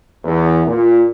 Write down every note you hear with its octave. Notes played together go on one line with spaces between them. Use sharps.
E2
A#2